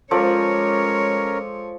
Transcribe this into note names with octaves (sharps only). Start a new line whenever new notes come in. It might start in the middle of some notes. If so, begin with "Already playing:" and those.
F3 G#3 C#4 A4 A#4 C#5 D5